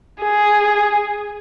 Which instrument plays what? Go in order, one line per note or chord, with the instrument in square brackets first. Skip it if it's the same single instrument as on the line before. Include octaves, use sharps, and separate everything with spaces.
[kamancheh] G#4